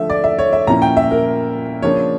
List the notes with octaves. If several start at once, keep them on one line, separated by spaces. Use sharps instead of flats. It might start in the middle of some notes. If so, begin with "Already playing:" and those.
Already playing: D3 F3 A3 E5
D5
E5
C#5
E5
A#2 F3 C#4 E4 A#5
G5
E5
A#4
C#3 F3 A#3 D4 C#5